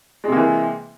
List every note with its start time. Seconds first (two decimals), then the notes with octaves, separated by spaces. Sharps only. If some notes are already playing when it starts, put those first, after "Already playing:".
0.24 G#3
0.28 C3
0.32 A#3
0.36 E3